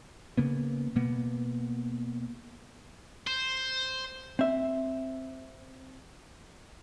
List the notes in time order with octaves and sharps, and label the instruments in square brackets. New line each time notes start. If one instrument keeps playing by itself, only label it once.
[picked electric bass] C#3 A#3 B3
B2 A#3 B3
[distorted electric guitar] C5
[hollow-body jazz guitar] C4 E5